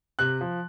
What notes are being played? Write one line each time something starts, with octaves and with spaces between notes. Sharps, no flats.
C3 F#6
F3